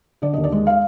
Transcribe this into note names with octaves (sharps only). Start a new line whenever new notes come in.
D3 D5
D#2 D#5
D5
G#3
F5